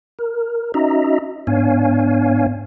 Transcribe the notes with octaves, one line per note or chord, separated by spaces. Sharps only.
A#4
C#4 D#4 F#4 D#5 E5 A#5
G#2 B3 D4 C#5 F5 G#5